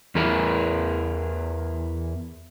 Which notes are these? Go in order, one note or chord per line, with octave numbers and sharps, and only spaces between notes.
E2 E3 E4 A#4